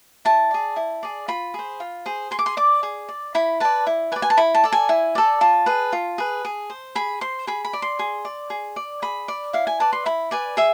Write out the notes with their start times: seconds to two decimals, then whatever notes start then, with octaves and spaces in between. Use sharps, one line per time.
0.25 E4 A5
0.51 G#4 D5
0.76 E4
1.03 G#4 D5
1.28 F4 B5
1.54 G#4 C5
1.80 F4
2.06 G#4 C5
2.31 G#4 C6
2.39 D6
2.46 C6
2.57 D5 D6
2.83 G#4
3.09 D5
3.35 E4 B5
3.60 B4 D5 A5
3.87 E4
4.12 B4 G#5
4.16 D5
4.22 G#5
4.30 A5
4.37 E4 B5
4.55 A5
4.64 A4 D5
4.72 G#5
4.89 E4
5.15 A4 D5
5.41 F4 A5
5.66 G#4 B4
5.92 F4
6.18 G#4 B4
6.45 G#4
6.70 C5
6.95 G#4 B5
7.21 C5 C6
7.47 G#4 B5
7.65 B5
7.73 D5
7.82 C6
7.99 G#4
8.25 D5
8.50 G#4
8.76 D5
9.02 G#4 B5
9.28 D5
9.53 E4 F5
9.67 G#5
9.80 B4 D5 A5
9.93 C6
10.06 E4 B5
10.31 B4 D5 G#5
10.57 G#4 E5